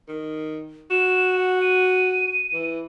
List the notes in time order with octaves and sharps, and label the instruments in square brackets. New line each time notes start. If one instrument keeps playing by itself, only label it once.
[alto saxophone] D#3
[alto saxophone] F#4 [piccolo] E7
[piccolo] F#5
D#7
[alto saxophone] E3